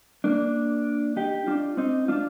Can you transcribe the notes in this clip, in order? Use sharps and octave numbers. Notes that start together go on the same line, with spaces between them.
A#3 D4
D#4 G4
D4 F4
C4 D#4
D4 F4